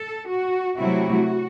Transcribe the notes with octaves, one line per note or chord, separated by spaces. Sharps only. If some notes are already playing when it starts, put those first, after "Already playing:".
Already playing: A4
F#4
C3 F#3 A3 C4 E4 F#4